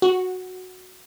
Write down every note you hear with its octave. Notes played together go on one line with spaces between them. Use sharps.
F#4